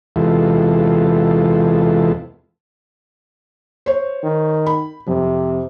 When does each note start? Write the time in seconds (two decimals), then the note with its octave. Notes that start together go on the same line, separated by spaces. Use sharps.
0.16 E2 C3 E3 G#3 F4 A4
3.86 C5 C#5
4.23 D#3
4.66 B5
5.08 F2 C3